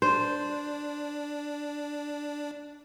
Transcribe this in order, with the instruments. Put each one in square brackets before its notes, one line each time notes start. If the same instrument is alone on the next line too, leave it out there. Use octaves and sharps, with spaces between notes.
[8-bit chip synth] D4 [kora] C5